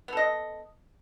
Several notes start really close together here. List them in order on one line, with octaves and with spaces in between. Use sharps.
B3 A4 D#5